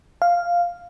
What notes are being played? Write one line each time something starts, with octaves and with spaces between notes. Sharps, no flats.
F5